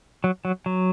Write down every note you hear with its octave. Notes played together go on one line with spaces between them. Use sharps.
F#3
F#3
F#3